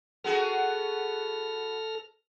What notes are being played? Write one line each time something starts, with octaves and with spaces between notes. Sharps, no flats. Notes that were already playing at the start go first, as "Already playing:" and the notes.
B3 F#4 G#4 A4 F6 A#6